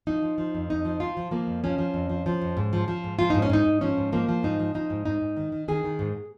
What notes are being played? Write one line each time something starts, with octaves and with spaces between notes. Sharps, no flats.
F3 D#4
F3
F3
F2
F2 D#4
F3
F3 F4
F3
F3 A#3
F2
F3 C#4
F3
F2
F3
F3
F2
G#2
F3
F3
G#2
F3 F4
G#2 D#4
C#4
G#2 D#4
G#2
F3 C#4
G#2
F3 A#3
F3
G#2 D#4
F3
F3 D#4
G#2
G#2 D#4
G#2
D#3
D#3
D#3 G#4
D#3
G#2